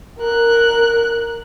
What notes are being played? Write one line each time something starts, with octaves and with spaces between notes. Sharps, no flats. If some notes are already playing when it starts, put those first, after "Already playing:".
A#4 F#6